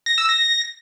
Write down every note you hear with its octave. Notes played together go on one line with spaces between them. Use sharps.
A#6
E6
A#6